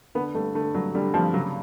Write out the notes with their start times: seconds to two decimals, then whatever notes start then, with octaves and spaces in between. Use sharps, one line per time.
0.15 D3 B3
0.35 G2 A3
0.55 D3 A3
0.74 G2 F#3
0.95 D3 G3
1.14 G2 F3
1.34 C#3 F#3